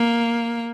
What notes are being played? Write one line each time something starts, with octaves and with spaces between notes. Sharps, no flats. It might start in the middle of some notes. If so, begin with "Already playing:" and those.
Already playing: A#3